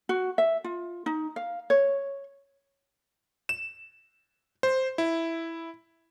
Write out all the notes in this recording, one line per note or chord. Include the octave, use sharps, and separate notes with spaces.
F#4
E5
F4
D#4
F5
C#5
E7
C5
E4